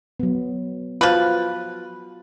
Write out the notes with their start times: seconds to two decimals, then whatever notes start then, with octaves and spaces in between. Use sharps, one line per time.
0.20 F#3 B3
1.01 F3 F4 F#4 B4